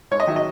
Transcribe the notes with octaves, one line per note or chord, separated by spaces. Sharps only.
G#2 C#5
D#5
D#3 F#3 E5
D#5